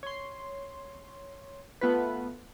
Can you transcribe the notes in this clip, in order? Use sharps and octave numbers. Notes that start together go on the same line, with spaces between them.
C#5 C6
A3 B3 F4 B4